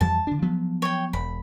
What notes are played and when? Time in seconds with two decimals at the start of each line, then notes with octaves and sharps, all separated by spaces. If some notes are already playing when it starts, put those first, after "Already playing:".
0.01 F2 E3 G3 A5
0.27 D3 D4
0.42 F3 F#3 B3
0.82 C#5 G5
1.13 E1 B5